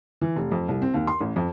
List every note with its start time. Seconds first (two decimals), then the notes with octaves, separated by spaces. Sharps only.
0.21 E3
0.36 F1
0.52 F2
0.68 C2
0.82 C4
0.94 D#2
1.07 C6
1.21 A1
1.36 F2